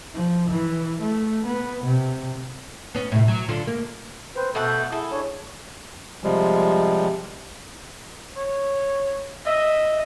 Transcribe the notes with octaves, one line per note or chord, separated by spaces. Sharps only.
F3
E3
A3
B3
C3
B3 C#4
A2 C3
F#3
D3 F4
A#3
C4 B4 C5
B2 A3 A4 F#5 G6
E4 G#4 A4
D4 C#5
C3 F3 G3 G#3
C#5
D#5 E5